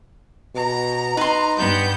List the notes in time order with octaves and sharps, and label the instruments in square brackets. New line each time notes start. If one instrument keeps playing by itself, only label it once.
[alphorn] B2 [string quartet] A#5
[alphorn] D#4 [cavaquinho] B4 C6
[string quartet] G2 B3 G6